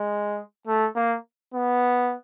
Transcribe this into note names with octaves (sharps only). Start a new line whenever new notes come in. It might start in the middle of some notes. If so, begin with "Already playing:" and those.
Already playing: G#3
A3
A#3
B3